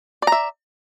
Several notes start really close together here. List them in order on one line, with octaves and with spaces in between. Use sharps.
D5 A#5 E5